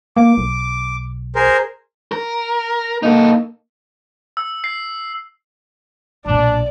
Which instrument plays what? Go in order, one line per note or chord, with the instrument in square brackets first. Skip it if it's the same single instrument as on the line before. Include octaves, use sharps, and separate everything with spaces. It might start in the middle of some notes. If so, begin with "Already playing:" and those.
[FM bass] A#3 [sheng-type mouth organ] D6
[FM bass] B1
[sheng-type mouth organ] G#4 A#4 C5
[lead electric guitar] A#4
[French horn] A#3 [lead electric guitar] D#4 A4
[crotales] E6
C7
[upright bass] B1 A#2 [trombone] D4 [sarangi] D5